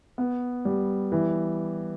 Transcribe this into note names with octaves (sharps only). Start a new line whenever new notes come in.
B3
G3
E3